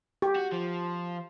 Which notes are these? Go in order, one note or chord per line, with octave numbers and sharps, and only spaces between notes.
G4
F#4
F3